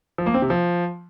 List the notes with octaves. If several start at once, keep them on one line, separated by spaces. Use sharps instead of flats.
F3
A#3
C4
C3
F3